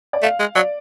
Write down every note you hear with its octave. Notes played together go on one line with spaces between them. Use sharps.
D5
A3 F5
G#3
F#3 D5